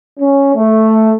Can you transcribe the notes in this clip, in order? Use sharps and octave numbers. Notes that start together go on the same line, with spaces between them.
C#4
A3